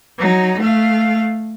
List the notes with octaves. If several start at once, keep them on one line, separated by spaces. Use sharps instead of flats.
F#3 D#4
A3 F5